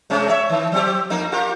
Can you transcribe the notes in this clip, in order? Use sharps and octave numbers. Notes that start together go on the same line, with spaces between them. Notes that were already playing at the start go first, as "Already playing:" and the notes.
C3 G#3 C#4
C#5 E5
D#3
F#3 C4 G4
F2 A#3 D#4
F4 G4 A#4